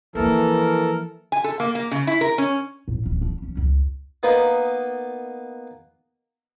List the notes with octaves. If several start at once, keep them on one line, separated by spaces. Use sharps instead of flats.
E3 F3 A#3 A4 A#4
G#5
A4
A#3
A#3
C#3
E4
A#4
C#4
A2
D1
D4
C#4
C#2
A#3 B3 D#4